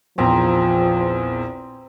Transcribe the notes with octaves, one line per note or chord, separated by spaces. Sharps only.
A#1 E2 F3 C4 A#5